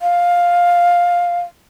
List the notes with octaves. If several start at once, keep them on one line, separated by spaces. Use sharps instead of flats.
F5